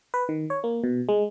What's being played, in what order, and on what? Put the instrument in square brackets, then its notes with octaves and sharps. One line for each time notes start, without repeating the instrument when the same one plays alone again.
[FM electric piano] B4
D#3
C#5
A#3
B2
G#3